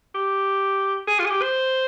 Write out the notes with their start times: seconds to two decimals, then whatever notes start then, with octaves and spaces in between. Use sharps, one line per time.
0.15 G4
1.07 G#4
1.19 F4
1.25 G#4
1.30 G4
1.42 C5